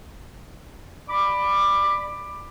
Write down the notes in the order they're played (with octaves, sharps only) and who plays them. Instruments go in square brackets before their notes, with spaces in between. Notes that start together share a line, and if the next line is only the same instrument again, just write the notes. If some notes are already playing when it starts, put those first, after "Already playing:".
[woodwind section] D5 B5 D6